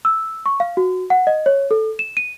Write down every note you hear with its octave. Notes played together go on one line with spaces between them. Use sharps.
E6
C#6
F5
F#4
F#5
D#5
C#5
A4
E7
D#7